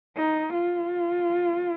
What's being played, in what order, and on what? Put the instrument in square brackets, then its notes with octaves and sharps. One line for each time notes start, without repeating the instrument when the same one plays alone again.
[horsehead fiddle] D#4
F4